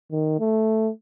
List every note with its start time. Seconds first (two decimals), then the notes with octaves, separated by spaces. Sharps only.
0.11 D#3
0.39 A3